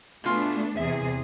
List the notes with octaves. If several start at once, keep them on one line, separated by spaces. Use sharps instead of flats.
B2 A3 B3 D4 F4 G#5
E2 C3 G#4 E5